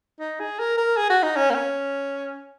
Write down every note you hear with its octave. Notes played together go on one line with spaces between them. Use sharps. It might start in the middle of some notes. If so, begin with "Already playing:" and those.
D#4
G#4
A#4
A#4
G#4
F#4
D#4
C#4
A#3
C#4